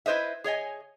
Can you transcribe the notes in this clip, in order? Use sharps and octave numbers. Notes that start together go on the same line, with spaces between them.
E4 B4 C5 D#5 E5
G#4 C#5 D#5 G#5